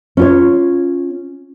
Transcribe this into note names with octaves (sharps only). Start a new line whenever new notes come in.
C#4 F4 C#5